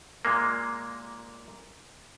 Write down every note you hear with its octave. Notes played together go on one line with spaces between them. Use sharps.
A#2 G#3 A#3